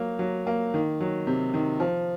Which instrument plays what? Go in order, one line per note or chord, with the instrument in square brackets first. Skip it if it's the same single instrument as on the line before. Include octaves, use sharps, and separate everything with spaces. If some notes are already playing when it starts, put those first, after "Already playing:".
Already playing: [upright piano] F#3 A#3
F#3
A#3
D#3
F#3
C3
D#3
F3